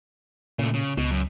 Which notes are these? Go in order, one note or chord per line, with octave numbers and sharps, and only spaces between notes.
A#2 C#3 A3
C#3
C#2 B2
F#2